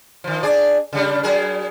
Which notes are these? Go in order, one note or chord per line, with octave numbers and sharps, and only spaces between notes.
D#3 F3
D4 G#4 D5
C#3 G3 D4
F#3 G#4 A#4